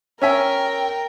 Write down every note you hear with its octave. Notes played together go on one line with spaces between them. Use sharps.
C#4 A#4 E5 G5 G#5